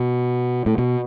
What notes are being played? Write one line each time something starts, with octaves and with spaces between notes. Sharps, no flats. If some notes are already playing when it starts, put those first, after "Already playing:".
Already playing: B2
A2
B2